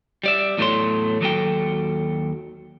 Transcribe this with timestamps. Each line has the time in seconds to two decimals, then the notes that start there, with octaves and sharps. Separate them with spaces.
0.24 G3 D5 E5
0.58 E2 A2 F#3 A3 C#5 C6
1.21 D#2 F#3 A4 G5